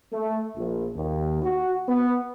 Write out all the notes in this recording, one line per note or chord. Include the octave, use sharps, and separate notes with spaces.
A3
A#1
D#2
F#4
B3